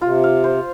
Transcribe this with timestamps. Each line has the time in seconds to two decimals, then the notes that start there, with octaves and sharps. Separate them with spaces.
0.01 C3 F4
0.24 F5
0.44 C5